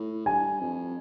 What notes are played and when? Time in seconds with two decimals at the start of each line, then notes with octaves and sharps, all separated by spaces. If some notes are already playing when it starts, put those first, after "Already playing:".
Already playing: A2
0.26 G2 G#5
0.60 F2